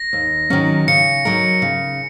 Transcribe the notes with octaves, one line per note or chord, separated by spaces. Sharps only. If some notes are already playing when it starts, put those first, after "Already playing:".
Already playing: A#6
D#2
D#3 F#3 C#4
C#3 C#7
F#3 D#4 A#4
C#3